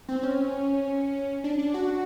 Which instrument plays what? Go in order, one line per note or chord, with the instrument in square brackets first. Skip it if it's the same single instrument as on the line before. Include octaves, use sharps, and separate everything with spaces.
[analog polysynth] C4
C#4
D4
D4
F#4